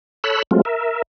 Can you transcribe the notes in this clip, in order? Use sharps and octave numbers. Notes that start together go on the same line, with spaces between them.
A4 C#5 B5 E6 F#6
F#3 G#3 A3 C4 F4
A#4 E5